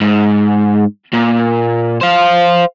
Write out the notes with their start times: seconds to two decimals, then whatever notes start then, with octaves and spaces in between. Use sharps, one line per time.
0.01 G#2
1.13 A#2
2.01 C5 F5